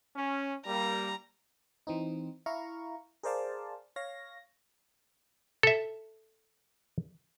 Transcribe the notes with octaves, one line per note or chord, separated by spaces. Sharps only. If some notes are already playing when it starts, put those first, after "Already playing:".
C#4
G3 A#3 A#5
E3 C4 D#4
E4 F5 A#5 C#6
G#4 A#4 C5 D5 F5 A5
C#5 F5 A#6
A4 E5